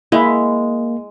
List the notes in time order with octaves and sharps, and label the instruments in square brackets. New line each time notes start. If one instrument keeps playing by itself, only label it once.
[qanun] G#3 [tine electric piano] A#3 [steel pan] E4